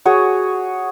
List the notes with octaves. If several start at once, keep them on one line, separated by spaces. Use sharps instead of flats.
F#4 G#4 C#5